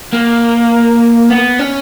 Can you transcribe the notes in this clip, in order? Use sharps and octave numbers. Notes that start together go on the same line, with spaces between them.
A#3
B3
C#4